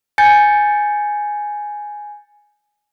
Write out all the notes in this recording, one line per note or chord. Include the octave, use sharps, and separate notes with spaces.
G#5 G6 A6 C#7